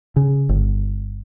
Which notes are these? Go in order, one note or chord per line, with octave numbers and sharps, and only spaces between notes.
C#3
G1